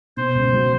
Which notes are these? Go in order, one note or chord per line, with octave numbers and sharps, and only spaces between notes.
B2 C5
C#2
F#3